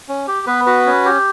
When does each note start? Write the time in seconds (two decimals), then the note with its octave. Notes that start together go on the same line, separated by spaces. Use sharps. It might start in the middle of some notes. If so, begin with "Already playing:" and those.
0.09 C#4
0.28 G4
0.47 B3 B4
0.66 F#4 B4
0.86 C#4
1.05 G4